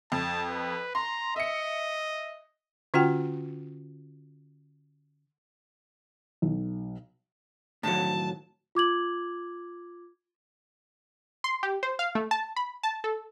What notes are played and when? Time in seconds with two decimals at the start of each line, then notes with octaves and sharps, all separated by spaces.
0.12 F2 A5
0.49 B4
0.95 A#5 C6
1.36 D#5 E5 C#7
2.94 D3 C#4 F4 F#4 F#5 G5
6.42 B1
7.83 A2 D#3 F#3 A5
8.75 F4 D6 G#6 F#7
11.44 C6
11.63 G4
11.83 C5
11.99 F5
12.15 A3
12.31 A5
12.56 B5
12.83 A5
13.04 A4